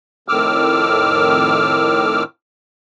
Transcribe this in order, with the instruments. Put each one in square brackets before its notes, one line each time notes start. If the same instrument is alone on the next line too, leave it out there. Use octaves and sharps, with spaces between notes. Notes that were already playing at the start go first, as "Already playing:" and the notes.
[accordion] F2 A2 D#3 D6 E6 F6